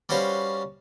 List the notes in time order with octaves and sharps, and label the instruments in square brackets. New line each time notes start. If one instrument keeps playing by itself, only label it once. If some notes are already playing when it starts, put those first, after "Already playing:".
[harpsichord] G3 C#4 F#4 B4 C5 F5